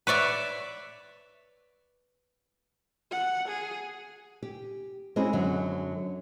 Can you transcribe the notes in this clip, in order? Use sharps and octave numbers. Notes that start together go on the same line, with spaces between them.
B4 C#5 D5 E5
F#5
G#4
G4
G#3 C4 C#4 E4 F#4 G#4
F#2 D3 F#3